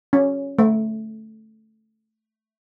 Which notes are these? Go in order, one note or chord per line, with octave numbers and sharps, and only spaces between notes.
C#4
A3